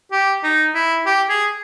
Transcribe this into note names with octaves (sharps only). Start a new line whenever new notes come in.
G4
D#4
E4
G4
G#4